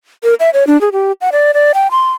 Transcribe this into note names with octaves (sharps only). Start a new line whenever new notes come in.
A#4
E5
C#5
D4
G#4
G4
F#5
D5
D5
G5
C6